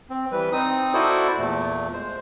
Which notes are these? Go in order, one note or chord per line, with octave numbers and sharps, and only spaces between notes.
C4
E3 G3 B4
C4 D#4 D#6
E4 F#4 A4 C5 D5
E2 A#2 A3
G#3 C5